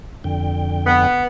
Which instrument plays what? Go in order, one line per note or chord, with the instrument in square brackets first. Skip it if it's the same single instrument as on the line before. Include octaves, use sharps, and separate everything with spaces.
[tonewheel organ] F2 D3 G5
[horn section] B3